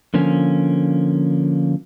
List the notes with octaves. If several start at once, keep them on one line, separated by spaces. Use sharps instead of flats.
D3 F3 A#3 C#4